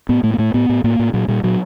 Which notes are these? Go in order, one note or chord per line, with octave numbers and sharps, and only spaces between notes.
A2 B3
A2 A3
A#3
A2 A3
A2 B3
A2
A2 A#3
A2
A#2 F#3
A#2 G3
A#2 F#3